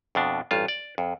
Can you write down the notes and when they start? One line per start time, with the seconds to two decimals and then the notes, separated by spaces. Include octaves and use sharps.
0.15 F2 B2 D4
0.51 A1 G2 F4
0.68 D5
0.98 F2